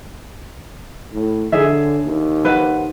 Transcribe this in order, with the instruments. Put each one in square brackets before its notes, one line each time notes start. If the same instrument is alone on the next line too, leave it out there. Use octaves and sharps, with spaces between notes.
[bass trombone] A2
[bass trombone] D3 [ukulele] G#4 C#5 E5
[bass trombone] D#2
[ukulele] B4 C5 F#5